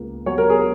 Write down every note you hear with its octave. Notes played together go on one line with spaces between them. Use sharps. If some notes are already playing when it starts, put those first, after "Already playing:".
Already playing: C#2 A#3
F#3 C#5
A#4
G#4